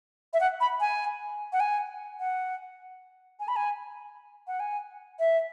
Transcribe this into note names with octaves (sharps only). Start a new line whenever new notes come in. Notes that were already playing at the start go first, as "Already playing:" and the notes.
E5
F#5
B5
G#5
F#5
G#5
F#5
G#5
B5
G#5
F#5
G#5
E5